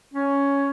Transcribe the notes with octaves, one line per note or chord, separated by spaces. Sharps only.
C#4